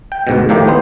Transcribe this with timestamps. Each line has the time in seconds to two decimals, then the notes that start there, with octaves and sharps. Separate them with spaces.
0.12 G5
0.27 D2 G#2 B2
0.49 A2 D#3 F3 A#3 G4
0.67 B3 C5